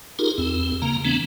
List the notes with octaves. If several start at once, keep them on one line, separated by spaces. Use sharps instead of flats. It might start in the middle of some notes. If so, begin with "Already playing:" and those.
D#4 F4 G4 G#4 A#4
E2 C4
C#3 A#3 A#5
E3 A3 B3 C4 D4